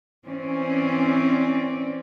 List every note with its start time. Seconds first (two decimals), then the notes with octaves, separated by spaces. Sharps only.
0.25 E3 C4 C#4 D5